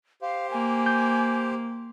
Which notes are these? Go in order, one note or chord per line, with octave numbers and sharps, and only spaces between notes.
G4 C5 F5
A#3 G#5
G6